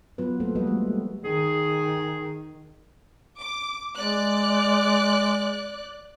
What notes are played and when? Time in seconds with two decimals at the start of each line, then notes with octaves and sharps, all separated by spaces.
0.18 F#3 B3 F4 B4
0.40 A3 A#3 A4 C5
0.55 F3 G3 F#4 B4 D#5
0.67 G#3 A3
0.87 G4
1.24 D#3 G#4
3.39 D6
3.96 G#3 D5 F#6